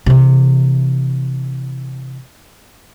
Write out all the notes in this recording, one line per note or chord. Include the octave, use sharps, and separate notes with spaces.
C3 E3